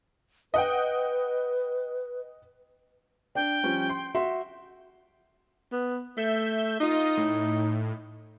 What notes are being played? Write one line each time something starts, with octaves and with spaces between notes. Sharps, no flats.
B4 D#5 F#5 G5
D4 G5
F3 G3 C#4
C6
F#4 E5 C6
B3
A3 E5 G6
D#4 F4 D#5
A2